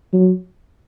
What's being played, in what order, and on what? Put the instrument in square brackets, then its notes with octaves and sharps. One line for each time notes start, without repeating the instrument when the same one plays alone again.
[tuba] F#3